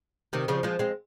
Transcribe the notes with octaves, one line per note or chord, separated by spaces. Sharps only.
C3 D#3
C#3 F3
F3 G#3
G#3 C4